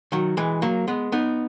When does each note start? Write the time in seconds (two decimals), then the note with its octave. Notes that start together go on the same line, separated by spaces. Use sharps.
0.12 D#3 F#3
0.37 E3 G#3
0.62 F#3 A#3
0.88 G#3 B3
1.12 B3 D#4